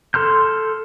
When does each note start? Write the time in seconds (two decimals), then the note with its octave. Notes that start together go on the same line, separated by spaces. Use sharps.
0.14 A4 C6 F6 G6